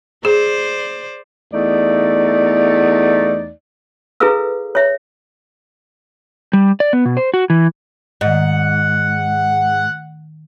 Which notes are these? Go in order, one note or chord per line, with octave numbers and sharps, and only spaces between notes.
G#4 C5 D5
E2 A3 D#4 D5
E4 G#4 A4 B4 F5 E6
C#5 E5
G3
D5
B3
B2
C5
F#4
E3
G#2 D#3 D#5 F#5